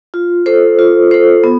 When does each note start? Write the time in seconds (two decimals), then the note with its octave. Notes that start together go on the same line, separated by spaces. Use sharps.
0.14 F4
0.46 A4 C5
0.79 F4
1.11 A4 C5
1.44 B3